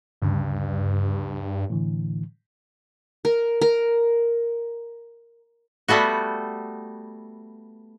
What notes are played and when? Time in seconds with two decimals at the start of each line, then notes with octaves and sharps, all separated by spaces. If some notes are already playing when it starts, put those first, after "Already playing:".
0.22 D2 G2 C#3
1.70 A2 D3 E3
3.25 A#4
3.61 A#4
5.88 G3 A3 B3 F#4